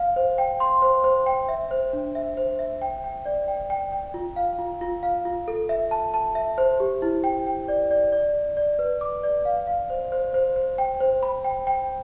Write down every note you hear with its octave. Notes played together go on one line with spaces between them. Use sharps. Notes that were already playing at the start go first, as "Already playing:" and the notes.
Already playing: F5
C5
G5
C6
C5
C5
G5
E5
C5
D4
E5
C5
E5
G5
G5
D5
G5
G5
G5
F4
F5
F4
F4
F5
F4
A4
E5
A5
A5
E5
C5
G4
E4
G5
G5
D5
D5
D5
D5
D5
B4
D6
D5
F5
F5
C5
C5
C5
C5
G5
C5
B5
G5
G5